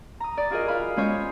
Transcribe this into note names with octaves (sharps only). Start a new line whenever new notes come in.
A#5 D#6
D5
F4 F#4 G#4 A#4 D#5
F4 F5 B5
G#3 C#4 C5 C#5 D#5